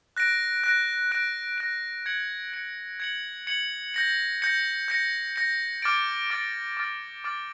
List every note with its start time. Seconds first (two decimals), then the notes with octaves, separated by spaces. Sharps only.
0.17 F#6 A#6 D7
0.64 F#6 A#6 D7
1.11 F#6 A#6 D7
1.58 F#6 A#6 D7
2.06 G#6 C#7 F#7
2.53 G#6 C#7 F#7
3.00 G#6 C#7 F#7
3.47 G#6 C#7 F#7
3.94 G6 A#6 C#7
4.42 G6 A#6 C#7
4.88 G6 A#6 C#7
5.36 G6 A#6 C#7
5.82 D6 F6 A6 D7
6.30 D6 F6 A6 D7
6.77 D6 F6 A6 D7
7.24 D6 F6 A6 D7